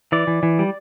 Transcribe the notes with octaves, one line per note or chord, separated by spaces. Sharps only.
E3 D5
E3
E3
G3